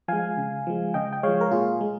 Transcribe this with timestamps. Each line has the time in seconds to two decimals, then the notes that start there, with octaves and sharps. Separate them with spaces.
0.08 F3 G#3 F5 G#5
0.38 C#3
0.67 F3 G#3
0.94 C#3 D#5 G5
1.13 G5
1.23 F3 G#3 C#5 F5
1.41 A#4
1.51 A#2 F4 G#4
1.81 G#3